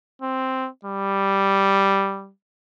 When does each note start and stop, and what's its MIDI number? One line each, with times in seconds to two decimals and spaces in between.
0.22 0.69 60
0.85 2.31 55